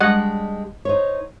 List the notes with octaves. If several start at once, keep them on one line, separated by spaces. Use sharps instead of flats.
G3 G#3 D4 D#5 F#5
D#4 C5 C#5